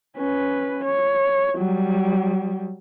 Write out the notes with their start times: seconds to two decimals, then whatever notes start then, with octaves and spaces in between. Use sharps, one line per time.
0.18 C#4 B4
0.84 C#5
1.58 F#3 G3